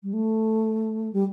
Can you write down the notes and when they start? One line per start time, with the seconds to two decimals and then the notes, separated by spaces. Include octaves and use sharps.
0.03 G3
0.13 A3
1.13 G3